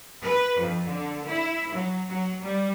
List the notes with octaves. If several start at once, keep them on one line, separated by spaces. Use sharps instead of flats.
B4
F2
D3
E4
F#3
F#3
G3